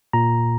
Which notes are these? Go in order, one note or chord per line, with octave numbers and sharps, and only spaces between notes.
A#2 A#5